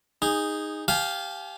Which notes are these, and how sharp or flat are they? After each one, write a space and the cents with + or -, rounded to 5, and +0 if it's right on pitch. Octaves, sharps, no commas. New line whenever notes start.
D#4 +0 G#4 -20
G4 +0 F5 +0 G#5 +45